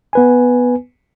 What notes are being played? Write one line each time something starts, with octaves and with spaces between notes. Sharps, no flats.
B3 B4 G#5